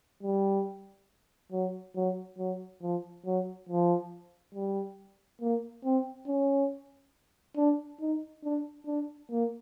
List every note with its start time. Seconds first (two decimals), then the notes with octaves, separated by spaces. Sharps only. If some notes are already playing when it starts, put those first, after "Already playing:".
0.23 G3
1.52 F#3
1.96 F#3
2.38 F#3
2.82 F3
3.26 F#3
3.69 F3
4.55 G3
5.41 A#3
5.85 C4
6.27 C#4
7.57 D4
8.01 D#4
8.44 D4
8.87 D4
9.31 A#3